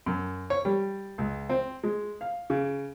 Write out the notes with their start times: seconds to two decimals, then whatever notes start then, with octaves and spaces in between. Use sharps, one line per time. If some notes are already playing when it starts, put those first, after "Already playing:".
0.06 F#2
0.50 C#5
0.65 G3
1.18 C#2
1.49 C4
1.84 G#3
2.21 F5
2.50 C#3